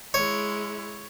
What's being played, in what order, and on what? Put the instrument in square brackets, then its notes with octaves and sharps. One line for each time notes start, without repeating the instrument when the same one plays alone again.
[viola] G#3 E4 [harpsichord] C#5